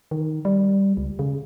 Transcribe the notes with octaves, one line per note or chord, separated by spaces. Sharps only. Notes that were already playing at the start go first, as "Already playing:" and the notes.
D#3
G3
C#2
C#3